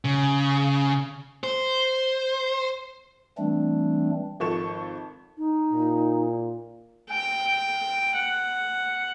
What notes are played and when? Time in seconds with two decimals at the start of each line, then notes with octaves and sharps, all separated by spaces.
0.05 C#3
1.44 C5
3.38 E3 G3 A3 C4 D4
4.40 G#1 F3 A4 C#6 E7
5.37 D#4
5.73 A#2
7.10 G5
8.16 F#5